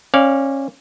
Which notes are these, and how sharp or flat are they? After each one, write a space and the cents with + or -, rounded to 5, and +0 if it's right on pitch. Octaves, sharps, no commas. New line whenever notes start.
C#4 -25 D5 -15 F5 +0